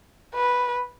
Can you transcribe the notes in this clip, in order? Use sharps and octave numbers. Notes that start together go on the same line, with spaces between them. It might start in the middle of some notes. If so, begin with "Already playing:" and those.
B4